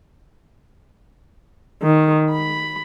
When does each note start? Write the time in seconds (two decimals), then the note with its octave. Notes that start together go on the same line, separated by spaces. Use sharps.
1.83 D#3
2.31 B5